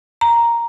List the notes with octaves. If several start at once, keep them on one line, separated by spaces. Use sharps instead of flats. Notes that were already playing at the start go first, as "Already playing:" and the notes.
A#5